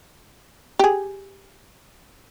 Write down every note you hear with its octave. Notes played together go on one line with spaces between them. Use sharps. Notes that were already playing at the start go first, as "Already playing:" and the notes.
G4 G#4